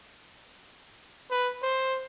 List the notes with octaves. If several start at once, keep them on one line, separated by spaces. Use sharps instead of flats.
B4
C5